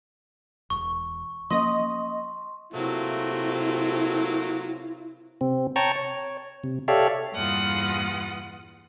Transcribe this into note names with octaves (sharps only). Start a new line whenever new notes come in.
E1 C#6
F3 A#3 C#4 D#5 C6
C3 F#3 A3 A#3 E4 F4
C3 C4
C#5 G5 A5 A#5 C#6
C#5
C3
G4 A4 C#5 D5 E5 F5
E2 G2 A#2 F4 F#5 D#6